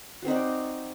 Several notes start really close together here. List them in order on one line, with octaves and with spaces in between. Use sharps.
F#4 C4 D#4 D5